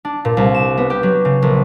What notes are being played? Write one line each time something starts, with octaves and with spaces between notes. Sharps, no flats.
D4
A#2
C2
E7
B3
G4
F#3
C#3
A#1